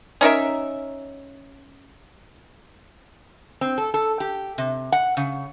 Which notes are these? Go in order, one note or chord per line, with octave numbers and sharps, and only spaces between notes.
C#4 D#4 A#4 E5
C4
A4
A4
G4
C3
F#5
C#3